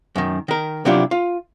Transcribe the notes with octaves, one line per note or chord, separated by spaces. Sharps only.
F#2 D#3
D#3 A#4
C3 F#3 D4 E4 F4 G4
F4